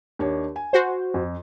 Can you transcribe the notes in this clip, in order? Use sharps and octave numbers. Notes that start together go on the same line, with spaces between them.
D#2 D4 C#5
G#5
F#4 C5
F2